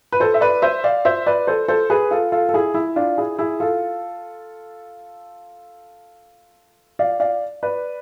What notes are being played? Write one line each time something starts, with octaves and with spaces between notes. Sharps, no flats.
B4
A4 C5
E5
B4 D5
C5 E5
D5 F5
C5 E5
B4 D5
A4 C5
A4 C5
G#4 B4
F4 A4
F4 A4
A4
E4 G#4
E4
D4 F4
E4 G#4
E4 G#4
F4 A4
D5 F5
D5 F5
B4 D5